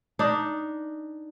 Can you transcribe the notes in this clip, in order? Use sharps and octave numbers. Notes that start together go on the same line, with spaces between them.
D4 D#4